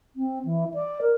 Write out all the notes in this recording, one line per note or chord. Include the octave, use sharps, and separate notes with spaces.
C4
E3
D5
A#4